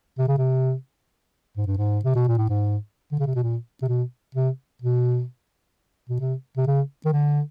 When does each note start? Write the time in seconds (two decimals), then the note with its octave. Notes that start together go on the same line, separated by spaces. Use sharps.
0.18 C3
0.28 C#3
0.38 C3
1.57 G#2
1.67 G2
1.77 G#2
2.04 C3
2.15 B2
2.28 A#2
2.38 A2
2.49 G#2
3.12 D3
3.19 C#3
3.27 C3
3.35 B2
3.43 A#2
3.82 C3
3.89 B2
4.35 C3
4.82 B2
6.09 B2
6.20 C3
6.57 C3
6.67 C#3
7.05 D#3
7.13 D3